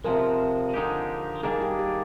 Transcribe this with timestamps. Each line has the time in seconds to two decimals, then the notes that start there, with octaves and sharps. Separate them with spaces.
0.04 C3 F3 G#3 A#4
0.74 D3 F3 G#3 D#4 G4
1.43 D#3 G3 A#3 D4 G#4
1.62 G4
1.79 G4